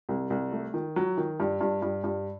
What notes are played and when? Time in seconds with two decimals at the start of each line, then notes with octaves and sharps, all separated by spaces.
0.09 C2
0.30 C2
0.52 A3
0.74 D#3
0.96 F#3
1.17 D#3
1.40 G2
1.61 G2
1.82 G2
2.04 G2